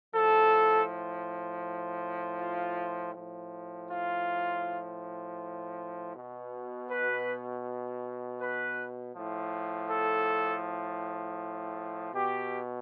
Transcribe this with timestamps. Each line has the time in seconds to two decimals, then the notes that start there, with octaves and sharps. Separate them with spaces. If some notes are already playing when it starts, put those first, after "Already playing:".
0.15 A2 F3 A4
2.40 F4
3.15 A2 F3
3.90 F4
6.15 B2
6.90 B4
8.40 B4
9.15 A2 F3
9.90 A4
12.14 B2 G4